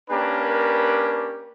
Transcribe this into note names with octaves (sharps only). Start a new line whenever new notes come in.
A#3 C#4 D4 G4 A#4 B4